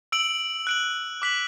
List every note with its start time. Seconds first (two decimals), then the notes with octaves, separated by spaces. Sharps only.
0.12 E6 D7 F#7
0.67 F#6 D7 F#7
1.22 D6 F#6 B6 F#7